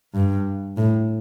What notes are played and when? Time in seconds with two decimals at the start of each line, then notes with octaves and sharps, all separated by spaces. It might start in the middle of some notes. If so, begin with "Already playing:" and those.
0.15 G2
0.78 A2